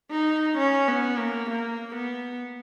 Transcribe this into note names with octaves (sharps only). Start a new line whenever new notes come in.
D#4
C#4
B3
A#3
A#3
B3